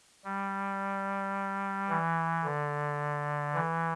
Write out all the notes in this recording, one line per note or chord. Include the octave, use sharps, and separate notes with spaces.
G3
E3
D3
E3